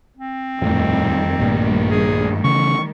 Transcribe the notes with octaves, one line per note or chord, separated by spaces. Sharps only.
C4
D#1 F2 A2 D#3 G3 A3
A#1 G2 A#2
G#4
C#3 E3 C#6